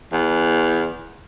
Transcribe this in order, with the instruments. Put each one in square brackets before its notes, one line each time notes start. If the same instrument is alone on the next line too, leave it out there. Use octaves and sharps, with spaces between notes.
[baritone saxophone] E2